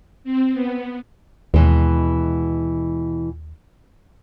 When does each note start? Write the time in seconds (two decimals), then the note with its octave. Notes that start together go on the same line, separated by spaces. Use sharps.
0.24 C4
0.53 B3
1.54 D#2 B2 E3 G#3